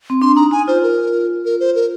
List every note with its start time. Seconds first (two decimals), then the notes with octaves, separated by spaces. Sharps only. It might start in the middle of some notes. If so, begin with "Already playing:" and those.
0.10 C4
0.21 D4 C6
0.36 D#4 A#5
0.51 D#4 G#5
0.68 F4 C5
0.83 A#4
1.45 A#4
1.60 C5
1.75 A#4